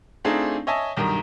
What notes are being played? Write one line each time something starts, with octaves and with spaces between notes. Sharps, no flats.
A3 C4 D4 D#4 F4 G#4
C#5 D#5 E5 G#5 A5
B1 G2 D#3 A#5